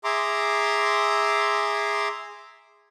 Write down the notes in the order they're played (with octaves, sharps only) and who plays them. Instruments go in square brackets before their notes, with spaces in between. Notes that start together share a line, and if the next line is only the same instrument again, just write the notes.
[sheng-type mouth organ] G#4 E5 A#5 C6 D6